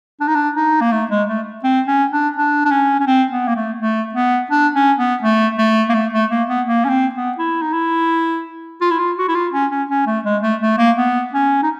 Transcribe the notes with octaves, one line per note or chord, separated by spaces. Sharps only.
D4
D#4
D4
D#4
A#3
A3
G#3
A3
C4
C#4
D4
D4
D4
C#4
C#4
C4
B3
A#3
A3
A3
B3
D4
C#4
B3
A3
A3
A#3
A3
A3
A#3
B3
A#3
C#4
C4
B3
E4
D#4
E4
F4
E4
F4
F#4
E4
F4
C#4
C#4
C#4
A3
G#3
A3
A3
A#3
B3
C#4
D#4